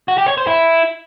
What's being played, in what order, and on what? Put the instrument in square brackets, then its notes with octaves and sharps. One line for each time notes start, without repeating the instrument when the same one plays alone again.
[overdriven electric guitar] F#4
G4
C#5
C5
E4